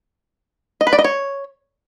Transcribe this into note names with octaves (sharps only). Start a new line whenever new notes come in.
D#5
B4
D5
D#5
C#5